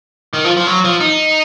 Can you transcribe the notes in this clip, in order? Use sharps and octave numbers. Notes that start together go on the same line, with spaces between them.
D#3
F3
F3
F#3
F3
D#4